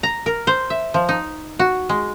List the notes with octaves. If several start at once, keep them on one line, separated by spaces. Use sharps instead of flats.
A#5
A#4
C5
E5
F3
D#4
F#4
G#3